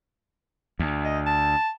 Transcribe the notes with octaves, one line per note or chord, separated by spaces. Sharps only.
D2
D#5
A5